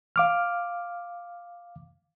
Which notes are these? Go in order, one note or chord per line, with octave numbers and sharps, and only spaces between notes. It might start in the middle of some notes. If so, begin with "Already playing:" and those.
F5 D6 F6